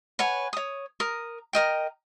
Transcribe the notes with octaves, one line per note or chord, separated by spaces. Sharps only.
B4 C#5 F#5 G#5
C#5 D#6
A#4 D#6
A#4 D#5 G5